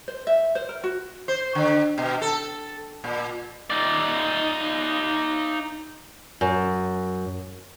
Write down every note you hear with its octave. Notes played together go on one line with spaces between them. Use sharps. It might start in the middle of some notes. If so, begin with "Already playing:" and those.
C5
E5
C5
A#4
F#4
C5
D3
B2
A4
A#2
D#4 D5
F#2